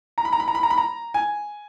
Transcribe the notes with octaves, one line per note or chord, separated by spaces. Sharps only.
A#5
B5
A#5
B5
A#5
B5
A#5
B5
A#5
G#5